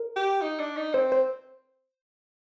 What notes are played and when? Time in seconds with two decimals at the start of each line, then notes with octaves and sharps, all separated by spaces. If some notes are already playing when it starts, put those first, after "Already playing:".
Already playing: A#4
0.16 G4
0.42 D#4
0.59 D4
0.77 D#4
0.93 C4 C5
1.12 C5